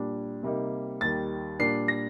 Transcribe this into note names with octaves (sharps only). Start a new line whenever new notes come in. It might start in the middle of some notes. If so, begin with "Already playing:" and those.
Already playing: A#2 G3 D4
C3 G3 A#3 D#4
D#2 D#3 G3 A6
A#2 G3 A#3 D4 C7
A#6